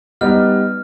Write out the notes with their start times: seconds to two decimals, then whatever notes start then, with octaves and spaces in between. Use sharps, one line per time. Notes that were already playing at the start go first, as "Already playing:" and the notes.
0.21 G3 B3 D#4 F6